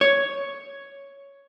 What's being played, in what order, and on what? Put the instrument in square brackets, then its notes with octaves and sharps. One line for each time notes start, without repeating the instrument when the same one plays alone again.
[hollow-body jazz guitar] C#5